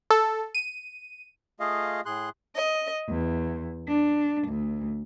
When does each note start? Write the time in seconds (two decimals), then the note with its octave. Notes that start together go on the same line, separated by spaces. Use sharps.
0.10 A4
0.55 D#7
1.60 A3 F4 G#4 D#5 F5
2.06 A2 G#4 C6 F#6
2.55 D#5
3.10 E2
3.87 D4
4.47 D2